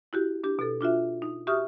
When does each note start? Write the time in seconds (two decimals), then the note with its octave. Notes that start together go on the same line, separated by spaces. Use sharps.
0.13 E4 F#4 G4
0.44 D4 G4
0.59 B2 A4
0.81 D4 F4 F#4 E5
1.22 D#4
1.47 F#4 G4 E5 C#6 D#6 F6